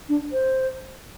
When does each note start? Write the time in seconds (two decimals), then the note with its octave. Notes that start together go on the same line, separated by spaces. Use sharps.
0.09 D4
0.32 C5